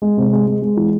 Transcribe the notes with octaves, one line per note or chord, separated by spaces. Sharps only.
G#3
C3
G#3
G#3
G#3
E3